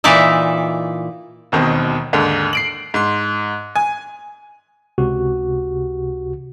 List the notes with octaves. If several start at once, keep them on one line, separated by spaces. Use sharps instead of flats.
A#2 E3 D#4 D5 E5
E1 D#2 B2 D#3 C4
D#2 G#2 D3
C7 D7 F#7
G#2 C6
G#5
C#2 C3 F#4 G4